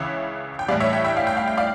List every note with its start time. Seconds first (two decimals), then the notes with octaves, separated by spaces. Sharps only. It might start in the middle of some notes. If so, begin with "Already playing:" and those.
Already playing: C#2 C#3 E3 C#5 E5
0.59 G5
0.68 A2 E3 G3 D5 F5
0.80 C#5 E5
0.93 E5 G5
1.04 E5 G5
1.17 F5
1.27 G5
1.37 F5
1.48 G5
1.57 D5 F5